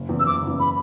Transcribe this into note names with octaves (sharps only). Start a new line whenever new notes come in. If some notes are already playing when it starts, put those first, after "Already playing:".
Already playing: F#1
E2 C#3
E6
F#1 D6
E2 C#3
B5